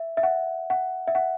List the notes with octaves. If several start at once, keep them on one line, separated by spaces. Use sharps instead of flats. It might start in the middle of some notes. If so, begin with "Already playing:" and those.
Already playing: E5
E5
F#5
F#5
E5
F#5